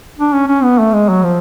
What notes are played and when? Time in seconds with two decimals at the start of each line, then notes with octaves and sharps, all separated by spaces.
0.19 D4
0.34 C#4
0.48 C#4
0.63 B3
0.79 A3
0.93 G#3
1.09 F#3
1.24 F3